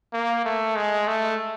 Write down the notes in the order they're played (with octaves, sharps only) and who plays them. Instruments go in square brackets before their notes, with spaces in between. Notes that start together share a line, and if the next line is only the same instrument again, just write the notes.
[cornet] A#3
A3
G#3
A3